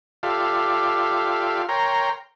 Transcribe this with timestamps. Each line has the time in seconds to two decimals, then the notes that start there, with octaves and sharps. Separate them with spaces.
0.23 F4 G4 A4 D5 E5 F5
1.69 A#4 C#5 G5 A#5 C6